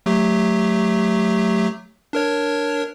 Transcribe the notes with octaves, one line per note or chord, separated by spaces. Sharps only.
F#3 A3 G4
D4 A#4 C#5